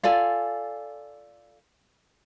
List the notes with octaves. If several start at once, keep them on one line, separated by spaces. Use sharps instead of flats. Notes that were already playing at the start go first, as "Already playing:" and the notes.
F4 A4 D5 G#5